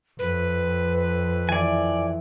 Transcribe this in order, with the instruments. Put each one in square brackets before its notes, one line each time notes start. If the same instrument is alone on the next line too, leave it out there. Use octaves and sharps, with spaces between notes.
[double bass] F2 [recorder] B4
[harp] E3 [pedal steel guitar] D5 G#5